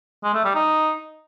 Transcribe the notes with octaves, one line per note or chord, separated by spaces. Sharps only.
G#3
A3
G3
D#4